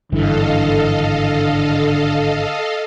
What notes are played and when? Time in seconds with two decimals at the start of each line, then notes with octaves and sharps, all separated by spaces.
0.12 G#1 G2 D3 E3 A4 D#5 F5